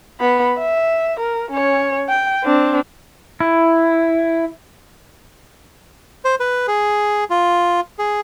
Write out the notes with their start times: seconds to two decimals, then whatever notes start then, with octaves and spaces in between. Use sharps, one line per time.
0.20 B3 B5
0.59 E5
1.20 A#4
1.51 C#4 C#5
2.09 G5
2.44 C4 D4
3.40 E4
6.25 C5
6.40 B4
6.68 G#4
7.30 F4
7.99 G#4